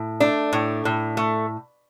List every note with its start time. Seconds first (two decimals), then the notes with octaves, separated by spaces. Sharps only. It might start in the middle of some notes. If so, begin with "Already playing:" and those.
Already playing: A2
0.20 A3 D4
0.53 A2
0.85 A2
1.17 A3